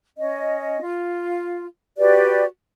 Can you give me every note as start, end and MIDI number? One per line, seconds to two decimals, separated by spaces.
0.18 0.82 61
0.18 0.82 75
0.82 1.67 65
1.98 2.44 66
1.98 2.44 67
1.98 2.44 71
1.98 2.44 74